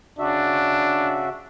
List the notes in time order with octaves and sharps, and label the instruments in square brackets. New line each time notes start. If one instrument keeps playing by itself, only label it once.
[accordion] C#3 F#4 E5 [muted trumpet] D4